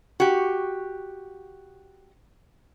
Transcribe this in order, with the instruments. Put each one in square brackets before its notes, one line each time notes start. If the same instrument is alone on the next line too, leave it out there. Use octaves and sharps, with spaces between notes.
[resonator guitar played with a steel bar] F#4 G4